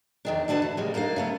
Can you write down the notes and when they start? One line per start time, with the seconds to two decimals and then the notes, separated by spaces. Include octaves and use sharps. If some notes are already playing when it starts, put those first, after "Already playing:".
0.25 E2 D#3 D4
0.48 D3 D4 F#4 B4 A5
0.62 E3
0.77 A2 C#3 G3 G#3
0.94 F#2 A#3 D4 D#4 F5
1.16 C#3 A3 B3